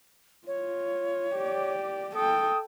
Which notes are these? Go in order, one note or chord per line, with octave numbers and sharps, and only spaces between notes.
F4 C#5
G4 D5
A4 G5 D#6